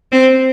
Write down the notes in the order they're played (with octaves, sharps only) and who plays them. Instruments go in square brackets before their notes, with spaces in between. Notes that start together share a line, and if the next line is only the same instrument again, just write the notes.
[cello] C4